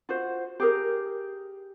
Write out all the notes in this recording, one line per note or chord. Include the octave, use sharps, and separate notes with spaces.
F4 F#4 C5
G4 G#4 A#4